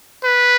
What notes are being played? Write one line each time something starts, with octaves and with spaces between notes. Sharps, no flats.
B4